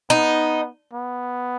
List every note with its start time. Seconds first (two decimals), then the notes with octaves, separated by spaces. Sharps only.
0.10 B3 D#4
0.94 B3